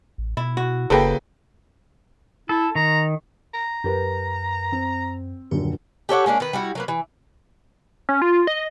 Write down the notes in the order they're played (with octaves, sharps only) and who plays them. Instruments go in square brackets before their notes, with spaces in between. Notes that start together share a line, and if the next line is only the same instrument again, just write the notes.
[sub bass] A1
[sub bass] B2 [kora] E4
[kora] F#4
[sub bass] F#1 [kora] C#3 A#3 [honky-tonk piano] A4 B4 G5
[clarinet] E4 [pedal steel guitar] A4
[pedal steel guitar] D#3 [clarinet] A#5
[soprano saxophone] A#5
[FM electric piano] F#2 [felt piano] G4 A#4 B4
[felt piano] C4
[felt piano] D#1 F#2 D3 [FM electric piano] C#4 G4
[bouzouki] G4 A4 C#5 F#5
G#3 A#3 C#4 D4
D#3 B4
G3 E4 F#4
F#3 A#3 B4
E3
[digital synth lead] C#4
F4
D#5